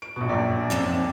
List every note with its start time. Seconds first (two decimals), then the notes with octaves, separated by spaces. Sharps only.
0.02 D7
0.16 A#1 B2
0.29 A#1 F#2 D5
0.70 F2 G#2 C3